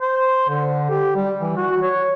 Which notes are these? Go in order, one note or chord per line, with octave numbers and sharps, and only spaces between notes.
C5
D3
G4
G3
E3
F#4
C#5